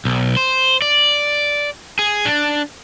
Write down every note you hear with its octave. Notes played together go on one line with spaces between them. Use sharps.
B1
C5
D5
G#4
D4